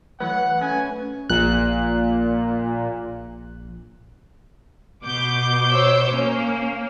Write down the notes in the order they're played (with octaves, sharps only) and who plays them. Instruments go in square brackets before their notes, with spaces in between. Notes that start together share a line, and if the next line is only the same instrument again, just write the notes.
[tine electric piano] E3 F#3 A3 [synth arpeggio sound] B4 [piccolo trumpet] F#5
[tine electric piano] A3 [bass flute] C#4 [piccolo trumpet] G#5
[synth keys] A#1 F#6 [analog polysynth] A#2
[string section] B2 D6 G6
[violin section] C5 C#5 E6
[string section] A#3 [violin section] C#4